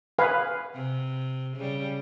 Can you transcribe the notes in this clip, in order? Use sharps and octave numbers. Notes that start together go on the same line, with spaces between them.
B4 F5 G#5
C3
C#3 G3